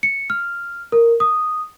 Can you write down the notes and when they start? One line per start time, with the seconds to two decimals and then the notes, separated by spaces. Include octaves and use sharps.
0.03 C#7
0.30 F6
0.92 A#4
1.20 D#6